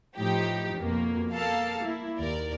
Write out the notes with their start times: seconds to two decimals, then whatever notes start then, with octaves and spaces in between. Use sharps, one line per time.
0.17 A2 F3 D#4 G4
0.78 F2 B2 A#3
1.32 A#3 A4 A#4 F5 A5
1.80 A#3 E4
2.18 D#2 A#4 D5